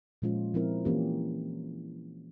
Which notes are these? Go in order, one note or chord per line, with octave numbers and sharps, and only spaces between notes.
A#2 F3 G#3 C#4 F4
F3 C4 E4 A#4
E3 A#3 C#4 G4